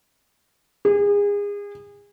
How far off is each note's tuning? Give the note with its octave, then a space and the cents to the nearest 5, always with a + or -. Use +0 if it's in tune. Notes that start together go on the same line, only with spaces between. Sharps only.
G#4 -30